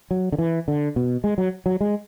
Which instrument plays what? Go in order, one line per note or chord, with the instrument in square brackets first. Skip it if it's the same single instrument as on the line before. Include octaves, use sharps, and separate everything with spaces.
[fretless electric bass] F#3
D3
E3
D3
B2
G#3
F#3
F#3
G#3